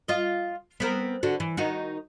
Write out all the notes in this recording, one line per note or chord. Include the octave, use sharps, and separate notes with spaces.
F4 D#5
B3 C4 A#4
D3 F#4
E3
D#3 D#4 F#4